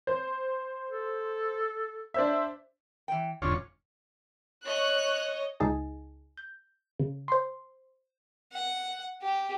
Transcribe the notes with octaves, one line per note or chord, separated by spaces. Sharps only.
C5
A4
D4 C5 E5
E3 G5
E1 G#2 D3 C#4 F4 C#5
C#5 D#5 F#6
C#2 D#4 G#4 A5
G6
C#3
C5 C6
F#5
G4